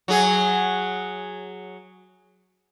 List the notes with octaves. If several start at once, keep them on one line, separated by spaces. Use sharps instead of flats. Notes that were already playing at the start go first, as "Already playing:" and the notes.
F#3 G#4